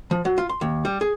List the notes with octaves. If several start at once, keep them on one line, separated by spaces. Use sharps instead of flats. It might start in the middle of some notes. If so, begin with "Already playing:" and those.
F3
F#3
F4
C6
D#2
G3
G#4